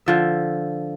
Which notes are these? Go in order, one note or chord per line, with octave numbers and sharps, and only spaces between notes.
D3 F3 E5